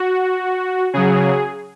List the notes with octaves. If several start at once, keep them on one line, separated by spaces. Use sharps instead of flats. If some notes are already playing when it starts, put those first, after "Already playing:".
Already playing: F#4
C#3 F#3 G#4